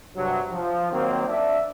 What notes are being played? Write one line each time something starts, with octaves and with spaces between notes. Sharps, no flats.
G2 C3 F#3
F3
D#3 F#3 A#3 C4
D4 D5 E5